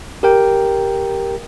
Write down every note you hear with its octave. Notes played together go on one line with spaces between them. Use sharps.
G4 A#4 G5